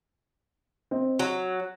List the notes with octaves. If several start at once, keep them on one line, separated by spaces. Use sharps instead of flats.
C4 D#5
F#3 F#4